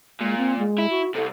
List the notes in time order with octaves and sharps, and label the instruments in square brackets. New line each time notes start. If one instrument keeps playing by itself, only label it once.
[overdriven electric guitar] A#2 [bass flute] G#3
[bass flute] C4
G#3
[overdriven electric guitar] E4
[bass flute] F#4
[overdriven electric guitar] C2 C3 [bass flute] A4